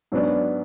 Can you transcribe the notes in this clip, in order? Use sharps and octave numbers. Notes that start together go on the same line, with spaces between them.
G#2 F#3 B3 D4